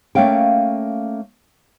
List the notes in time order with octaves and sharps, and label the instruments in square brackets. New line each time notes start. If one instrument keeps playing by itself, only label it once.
[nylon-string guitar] A3 A#3 C#4 F5 G5